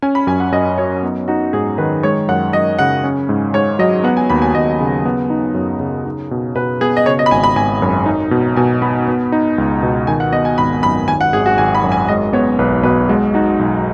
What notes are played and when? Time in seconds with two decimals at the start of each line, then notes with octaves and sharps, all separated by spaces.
0.02 C#4 G#5
0.15 B5
0.27 F#2 G#5
0.40 F#5
0.52 F#2 D#5
0.78 F#3 C#5
1.03 B3 D#4
1.28 D#4 F#4
1.53 G#2 G#4
1.78 D#3 B4
2.03 G#3 C#5
2.28 F#2 F#5
2.53 F#2 D#5
2.79 C#3 F#5
3.04 C#4
3.29 G#2
3.54 G#2 C#5
3.79 F#3 D#5
4.04 B3 F#5
4.17 G#5
4.30 D#2 B5
4.42 G#5
4.55 D#2 D#5
4.80 C#3
5.06 B3
5.30 D#4
5.55 F#2
5.80 C#3
6.05 D#4
6.31 B2
6.55 B2 B4
6.81 B3 G#4
6.97 D#5
7.06 C#3 C#5
7.19 D#5
7.26 B5
7.31 G#1 G#5
7.44 B5
7.56 G#1 G#5
7.82 F#2
8.06 D#4
8.31 B2
8.56 B2 G#5
8.82 B3 B5
9.08 B3
9.32 D#4
9.58 C#2
9.83 B2
10.07 D#3 G#5
10.20 F#5
10.32 B3 D#5
10.45 G#5
10.58 G#1 B5
10.83 F#2 B5
11.08 D#3 G#5
11.21 F#5
11.33 G#1 G#4
11.46 F#4
11.58 G#1 G#5
11.75 B5
11.84 F#2
11.92 G#5
12.08 G#3 D#5
12.33 B3 C#5
12.59 B1 B4
12.83 B2 B4
13.09 G#3 F#4
13.34 D#4 F#4
13.59 B1